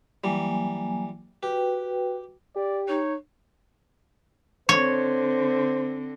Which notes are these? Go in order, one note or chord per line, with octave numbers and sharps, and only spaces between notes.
E3 F#3 G3 A#3 G#5
F#4 G4 B4 G5
G4 D5
D#4 C#5
D3 C4 C5 C#5